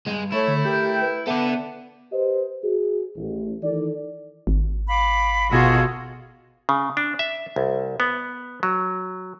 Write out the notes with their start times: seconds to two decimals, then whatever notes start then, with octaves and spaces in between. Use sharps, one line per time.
0.07 D2 G2 G#3
0.32 A3 E4 A4 C#5 C#6
0.48 D3
0.65 G4 A#4 G5 G6
1.01 B4
1.27 B3 A4 B4 D5 E5
2.12 G4 B4 C5 D#5
2.64 F#4 G#4
3.17 A1
3.63 D#3 E3 D#4 A4 D5
4.47 G#1
4.88 F5 B5 D6
5.51 B2 F4 F#4 G#4 A4
6.69 C#3
6.97 D4
7.19 E5
7.56 C2
8.00 B3
8.63 F#3